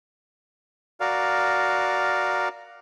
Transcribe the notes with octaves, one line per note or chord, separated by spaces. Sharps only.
F#4 A#4 D5 F5